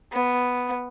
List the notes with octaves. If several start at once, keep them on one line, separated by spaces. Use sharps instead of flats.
B3